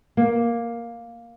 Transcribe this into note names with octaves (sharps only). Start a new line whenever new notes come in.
A#3